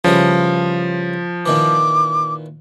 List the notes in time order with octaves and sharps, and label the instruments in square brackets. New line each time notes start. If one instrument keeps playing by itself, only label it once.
[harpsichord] C#3 E3 G3 [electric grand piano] F3
[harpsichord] A#2 D#3 E3 [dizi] D6